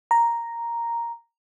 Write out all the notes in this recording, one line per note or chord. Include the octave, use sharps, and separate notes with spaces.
A#5